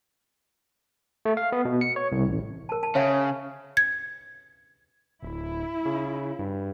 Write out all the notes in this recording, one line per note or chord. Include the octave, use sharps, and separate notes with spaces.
A3
F5
B3
B2
C#7
C#5
C2
A1
A#4 A5
A5
C#3 C#5 E5 F#5
G#6
D1 E4
C#3
G2